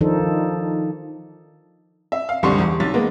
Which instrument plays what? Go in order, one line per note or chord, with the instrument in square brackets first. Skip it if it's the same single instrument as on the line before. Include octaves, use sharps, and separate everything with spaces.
[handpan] D#3 F3 D4 D#4 A4 C5
[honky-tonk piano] E5
F5
F#1 C2 D3 G3 C6 C#6
E2
B1 A6
G#3 A#3 B3